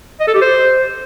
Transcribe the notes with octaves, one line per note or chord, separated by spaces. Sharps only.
D#5
A4
G4
C5